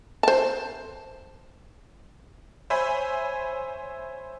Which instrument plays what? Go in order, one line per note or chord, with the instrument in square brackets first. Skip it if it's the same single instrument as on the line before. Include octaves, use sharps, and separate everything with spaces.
[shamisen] C5 A5
[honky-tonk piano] C5 C#5 E5 G#5 B5